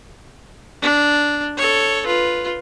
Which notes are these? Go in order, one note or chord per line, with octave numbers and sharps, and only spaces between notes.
D4
A4 C#5
F4 B4